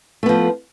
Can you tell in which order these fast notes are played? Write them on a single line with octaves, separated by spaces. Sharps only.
A3 B3 F3